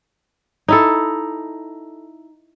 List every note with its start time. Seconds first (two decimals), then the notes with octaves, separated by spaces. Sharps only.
0.68 D#4 E4 A4